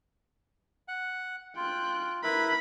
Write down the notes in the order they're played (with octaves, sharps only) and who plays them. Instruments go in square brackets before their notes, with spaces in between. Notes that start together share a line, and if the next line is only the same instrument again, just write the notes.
[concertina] F#5
[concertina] F4 [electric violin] G5 F#6
[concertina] E4 A#4 B4 [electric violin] B5